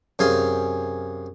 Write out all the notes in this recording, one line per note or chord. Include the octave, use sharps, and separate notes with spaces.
F#2 C3 G#4 F5 G#5 C6